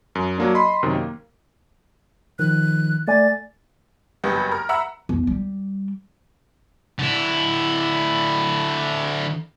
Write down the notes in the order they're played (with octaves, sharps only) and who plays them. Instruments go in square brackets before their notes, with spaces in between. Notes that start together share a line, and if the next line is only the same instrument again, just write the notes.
[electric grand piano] F#2
F#3 A#3 D4
D#5 B5 C6
F#2 C3 D#3
A#3
[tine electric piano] D#3 F3 [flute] F#6
[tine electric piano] A3 D5 G#5 [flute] A6
[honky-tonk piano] F#1 G2 B3 G4
A#4
E5 F#5 A#5 B5 E6
[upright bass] E2
G3
[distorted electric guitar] D3 E4